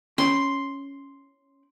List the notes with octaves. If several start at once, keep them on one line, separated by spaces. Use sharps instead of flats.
C#4 G5 B5 C6